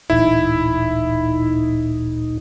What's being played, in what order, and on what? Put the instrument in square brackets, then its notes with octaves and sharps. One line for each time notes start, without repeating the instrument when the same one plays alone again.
[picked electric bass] D1 A1 [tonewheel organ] A#2 D#4 [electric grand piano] E4